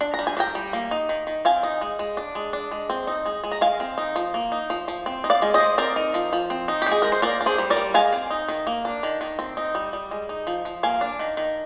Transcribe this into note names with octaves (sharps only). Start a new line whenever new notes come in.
D4
A#5
G3
G#5
D4
G5 A#5
G3
A#3
D#4
D#3
D#3
C4 F5 G#5
D#4
G#3
G#3
D4
G#3
D4
G#3
C4
D#4
G#3
G#3
A#5
G#3 F5 G#5
C4
D#4
F3
A#3
D#4
F3
F3
C4
D#4
D5 F5
G#3
C5 D#5
G#3
C4 A#4 D5
D#4
F3
F3
C4
D#4
G#3 G4
G#4
G#3 A#4
C5
A#3 A#4 D5
D4
G#4 C5
G3
A#4 D5
G3
G#3 F5 G#5
C4
D#4
D#3
A#3
D4
D#3
D#3
C4
D#4
G3
G3
G#3
D#4
F3
F3
A#3 F5 G#5
D4
D#3
D#3